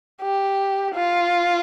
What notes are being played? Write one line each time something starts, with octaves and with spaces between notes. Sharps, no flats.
G4
F4